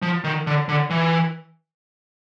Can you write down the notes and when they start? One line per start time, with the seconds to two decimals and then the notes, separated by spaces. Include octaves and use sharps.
0.02 F3
0.24 D#3
0.47 D3
0.69 D3
0.90 E3